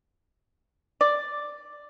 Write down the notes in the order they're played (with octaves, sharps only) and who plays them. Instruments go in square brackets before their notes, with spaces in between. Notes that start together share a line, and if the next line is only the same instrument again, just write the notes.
[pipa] D5